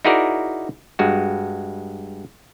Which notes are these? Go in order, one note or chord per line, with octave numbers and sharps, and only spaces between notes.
D#4 E4 F#4 G#4 A#4 D5
G2 G#3 F#4